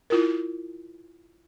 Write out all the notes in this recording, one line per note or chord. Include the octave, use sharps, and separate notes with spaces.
E4 F4 A#4